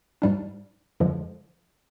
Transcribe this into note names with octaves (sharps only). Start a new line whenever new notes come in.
G#2 G3 D4
F2 D3 F3 G#3